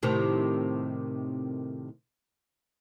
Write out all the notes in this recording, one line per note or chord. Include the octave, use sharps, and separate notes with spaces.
A2 C3 D#3